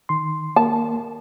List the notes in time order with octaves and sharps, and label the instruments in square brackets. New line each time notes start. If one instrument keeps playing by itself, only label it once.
[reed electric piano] D#3 C6
[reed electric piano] A#3 [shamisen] A5